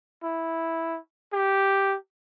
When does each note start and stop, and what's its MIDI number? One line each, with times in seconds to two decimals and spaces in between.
0.23 0.99 64
1.33 1.96 67